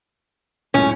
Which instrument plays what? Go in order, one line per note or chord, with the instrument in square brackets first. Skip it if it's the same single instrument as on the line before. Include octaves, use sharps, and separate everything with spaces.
[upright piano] C#2 F#2 A2 [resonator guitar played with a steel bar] C#4